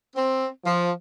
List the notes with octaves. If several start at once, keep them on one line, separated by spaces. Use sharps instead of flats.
C4
F3